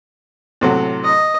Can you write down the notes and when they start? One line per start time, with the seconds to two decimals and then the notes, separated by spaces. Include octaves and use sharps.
0.61 A2 C3 F#3
1.04 D#5